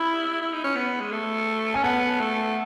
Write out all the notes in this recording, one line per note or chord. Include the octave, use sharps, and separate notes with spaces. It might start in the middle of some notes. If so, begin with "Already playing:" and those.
Already playing: E4 B5
E4
D#4
C#4
B3
G#3
A3
C#4 G#5
B3 F#5 A5
A3